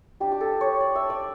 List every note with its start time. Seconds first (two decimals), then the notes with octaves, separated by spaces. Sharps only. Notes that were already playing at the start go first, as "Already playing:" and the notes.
0.20 G3 D4 G4
0.32 G4
0.41 A4
0.61 C#5
0.80 D5
0.95 E5
1.10 D5